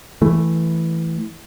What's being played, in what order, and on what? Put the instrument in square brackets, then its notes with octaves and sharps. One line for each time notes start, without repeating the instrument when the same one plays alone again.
[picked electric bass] E3 A3